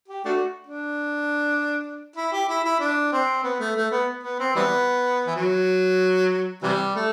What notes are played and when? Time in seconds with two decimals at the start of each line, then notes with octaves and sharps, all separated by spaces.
0.08 G4
0.25 A3 D4 F#4
0.67 D4
2.16 E4
2.32 G4
2.48 E4
2.64 E4
2.80 D4
3.12 C4
3.43 B3
3.60 A3
3.76 A3
3.91 B3
4.23 B3
4.39 C4
4.56 E3 G3 B3
5.27 E3
5.36 F#3
6.63 C3 E3 G3
6.95 A3